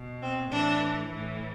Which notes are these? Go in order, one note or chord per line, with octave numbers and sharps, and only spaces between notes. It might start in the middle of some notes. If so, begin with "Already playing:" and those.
Already playing: B2
C4
A2 E3 D4
A2 E3